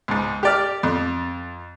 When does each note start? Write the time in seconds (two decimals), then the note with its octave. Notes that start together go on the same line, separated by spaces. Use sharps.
0.08 C#2 G#2
0.43 G4 D5 F6
0.83 F2